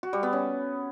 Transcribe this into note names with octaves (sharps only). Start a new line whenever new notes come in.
F#4
G3
B3
C#4